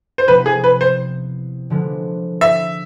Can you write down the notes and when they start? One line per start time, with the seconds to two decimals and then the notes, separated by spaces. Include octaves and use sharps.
0.18 C5
0.27 C3 F3 B3 E4 B4
0.46 G#4
0.64 B4
0.81 C5
1.70 D3 F3 G#3 B3 D4
2.41 E5